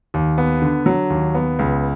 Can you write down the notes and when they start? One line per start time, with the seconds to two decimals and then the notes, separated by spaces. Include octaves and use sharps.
0.14 D#2
0.38 B3
0.62 D3
0.86 F#3
1.10 D#2
1.35 B3
1.59 C#2